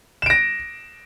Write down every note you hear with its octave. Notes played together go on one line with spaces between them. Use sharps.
A#6 D7 E7